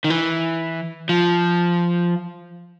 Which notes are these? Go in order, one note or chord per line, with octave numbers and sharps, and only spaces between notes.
D#3
E3
F3